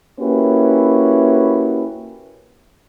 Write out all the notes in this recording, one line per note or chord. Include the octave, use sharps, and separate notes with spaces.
A#3 C#4 E4 F#4 G4 B4